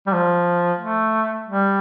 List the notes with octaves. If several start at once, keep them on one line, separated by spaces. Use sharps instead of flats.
G3
F3
A3
G3